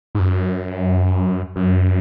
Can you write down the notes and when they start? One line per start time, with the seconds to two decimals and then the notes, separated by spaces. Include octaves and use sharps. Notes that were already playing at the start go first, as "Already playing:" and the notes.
0.15 G#2
0.19 F#2
1.56 F#2